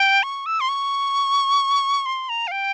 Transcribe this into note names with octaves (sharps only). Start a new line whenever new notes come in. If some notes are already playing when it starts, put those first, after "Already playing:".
Already playing: G5
C#6
E6
C6
C#6
C6
A#5
F5
G5